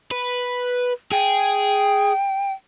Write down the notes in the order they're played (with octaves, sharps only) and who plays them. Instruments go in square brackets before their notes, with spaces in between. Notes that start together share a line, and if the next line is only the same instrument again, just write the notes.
[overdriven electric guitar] B4
[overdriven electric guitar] G#4 [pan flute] G5